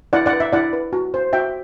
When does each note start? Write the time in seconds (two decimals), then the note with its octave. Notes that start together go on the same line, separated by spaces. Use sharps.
0.13 E4 D5 F#5
0.26 D5 F#5
0.33 B4
0.40 E5
0.53 E4 D5 F#5
0.73 B4
0.93 F#4
1.14 C5
1.33 F#4 E5 G5